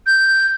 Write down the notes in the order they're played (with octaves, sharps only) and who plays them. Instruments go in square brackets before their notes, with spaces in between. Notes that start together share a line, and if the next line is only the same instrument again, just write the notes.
[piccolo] G6